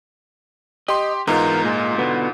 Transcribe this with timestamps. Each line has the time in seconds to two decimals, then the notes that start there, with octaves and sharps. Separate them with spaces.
0.88 G4 D#5 C6
1.27 E2 G#2 B3 D#4 F4 A#4
1.64 A#2 G#3
1.98 B2 D3 B3